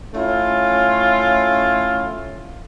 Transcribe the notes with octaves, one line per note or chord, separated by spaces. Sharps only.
A3 C#4 E4 F4